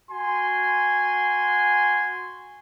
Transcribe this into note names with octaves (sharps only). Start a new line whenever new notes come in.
F#4 G#5 C6